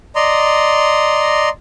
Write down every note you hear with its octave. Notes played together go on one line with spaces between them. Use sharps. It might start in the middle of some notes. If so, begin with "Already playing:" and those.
D5 D#5 A#5 C6